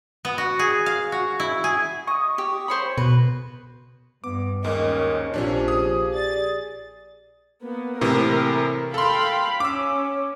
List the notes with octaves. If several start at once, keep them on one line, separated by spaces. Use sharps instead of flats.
B3
F#4
G#4
F5
F#4
E4
G#4
D#5 C#6 D#6
G4
C5 C#5 B5
B2 B4
G2 B3 D6
D#2 G#2 C#4 A#4 D#5
A#1 C3 F3 C#4 D4 G4
G#4 D#6
D5 A6
A#3 B3
A2 C3 E3 A#4
A4 F5 G5 B5 C6
C#4 D6 E6